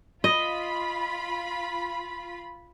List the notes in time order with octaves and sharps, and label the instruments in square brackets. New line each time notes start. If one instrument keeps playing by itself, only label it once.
[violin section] F4 B5 [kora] D#5